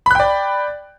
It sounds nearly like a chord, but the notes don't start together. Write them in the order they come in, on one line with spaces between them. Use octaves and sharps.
B5 F#6 G5 D5